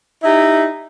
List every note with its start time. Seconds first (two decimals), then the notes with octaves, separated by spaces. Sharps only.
0.24 D#4 E4 G4